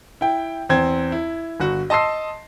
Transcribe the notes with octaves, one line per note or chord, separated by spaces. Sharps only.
E4 G5
E2 C4 G#6
E4
G1 F#4
D#5 A5 C6 E6 C7